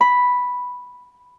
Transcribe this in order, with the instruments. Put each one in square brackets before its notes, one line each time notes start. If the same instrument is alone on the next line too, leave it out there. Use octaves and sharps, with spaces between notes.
[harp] B5